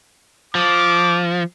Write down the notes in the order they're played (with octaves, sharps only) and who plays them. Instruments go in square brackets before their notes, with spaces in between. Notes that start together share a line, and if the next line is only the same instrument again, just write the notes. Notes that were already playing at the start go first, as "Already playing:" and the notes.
[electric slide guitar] F3 [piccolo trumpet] D6